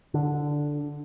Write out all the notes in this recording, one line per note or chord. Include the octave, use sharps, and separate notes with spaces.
D3